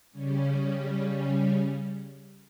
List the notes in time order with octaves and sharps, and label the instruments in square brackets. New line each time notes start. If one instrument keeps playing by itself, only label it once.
[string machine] C#3 G3 C#4